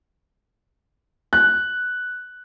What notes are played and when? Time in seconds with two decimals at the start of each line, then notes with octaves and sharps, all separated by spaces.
1.33 F#6